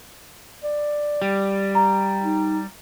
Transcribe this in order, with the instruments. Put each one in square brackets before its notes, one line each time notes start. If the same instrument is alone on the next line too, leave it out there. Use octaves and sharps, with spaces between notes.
[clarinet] D5
[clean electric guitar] G3
[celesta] A#5
[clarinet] D#4